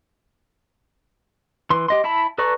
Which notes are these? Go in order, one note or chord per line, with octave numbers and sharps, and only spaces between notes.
E3 C6
G4 D#5 C6
E4 E5 A5 B5
A4 B4 D5 A#5 C#6